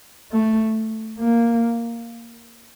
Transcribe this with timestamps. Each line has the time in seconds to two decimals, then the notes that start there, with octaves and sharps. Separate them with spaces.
0.32 A3
1.19 A#3